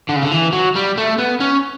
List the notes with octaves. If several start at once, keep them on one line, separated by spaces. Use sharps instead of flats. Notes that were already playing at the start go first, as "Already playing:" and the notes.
D3
C#3
D3
E3
F#3
G3
A3
B3
C#4